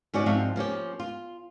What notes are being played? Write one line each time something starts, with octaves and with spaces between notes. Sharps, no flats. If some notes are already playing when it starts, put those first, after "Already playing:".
G#2 C#4 F#4 D5
G#2 F3 C4 E5 F5
F3 A#3 C#4 G4
F4